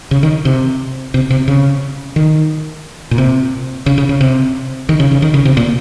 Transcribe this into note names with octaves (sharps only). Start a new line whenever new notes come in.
C#3
D#3
C3
C3
C3
C#3
D#3
A#2
C3
C#3
C#3
C#3
C3
D#3
C#3
C#3
D#3
C#3
C3
A#2